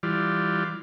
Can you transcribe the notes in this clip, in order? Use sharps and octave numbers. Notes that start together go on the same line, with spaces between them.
E3 G3 F4 D5